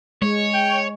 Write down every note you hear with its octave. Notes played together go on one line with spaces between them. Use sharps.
G#3 C#5
G5